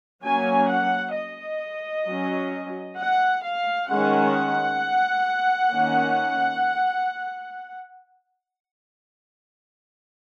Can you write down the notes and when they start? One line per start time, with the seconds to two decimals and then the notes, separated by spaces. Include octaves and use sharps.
0.24 F#3 A#3 C#4 G#5
0.70 F#5
1.15 D#5
2.07 F#3 C#4
2.98 F#5
3.44 F5
3.89 D#3 G#3 C#4 F#5
5.72 D#3 A#3 C#4